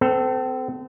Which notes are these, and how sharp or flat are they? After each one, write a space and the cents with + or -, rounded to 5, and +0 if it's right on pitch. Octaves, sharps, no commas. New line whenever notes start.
C4 -35 A4 +0